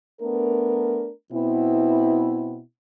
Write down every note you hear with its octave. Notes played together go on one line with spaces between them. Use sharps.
A3 B3 D4 A#4
B2 B3 C4 E4